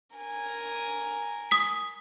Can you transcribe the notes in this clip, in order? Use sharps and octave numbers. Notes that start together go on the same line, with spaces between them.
A#4 G#5
D#6 B6